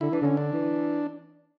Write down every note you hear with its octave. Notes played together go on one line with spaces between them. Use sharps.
D3 E4
E3 D4
D3 C#4
D4
E3